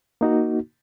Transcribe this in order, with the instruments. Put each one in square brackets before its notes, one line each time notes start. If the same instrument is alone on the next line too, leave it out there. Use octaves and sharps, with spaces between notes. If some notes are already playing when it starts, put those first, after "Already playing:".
[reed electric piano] A#3 D#4 F#4